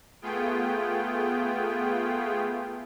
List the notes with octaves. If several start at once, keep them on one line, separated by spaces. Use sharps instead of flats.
A3 B3 F4 G#4 G5